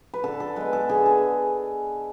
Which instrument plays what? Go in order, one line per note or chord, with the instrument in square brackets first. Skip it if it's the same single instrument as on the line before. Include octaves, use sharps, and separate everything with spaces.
[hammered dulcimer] B4
D3 A4
A4
G#3 B3 B4
A4
D3 G#4
G#4